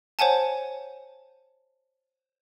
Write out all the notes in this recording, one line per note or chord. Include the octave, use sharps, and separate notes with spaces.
C5 C#5 F#5 G#5 A5